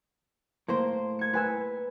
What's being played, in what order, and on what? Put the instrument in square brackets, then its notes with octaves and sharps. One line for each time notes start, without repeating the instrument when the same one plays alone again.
[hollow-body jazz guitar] A2 A#4 C5 [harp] A#3
[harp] G#6 C#7
B4 G#5 E6